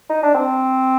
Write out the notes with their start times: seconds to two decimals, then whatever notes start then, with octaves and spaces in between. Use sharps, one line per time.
0.10 D#4
0.23 D4
0.34 C4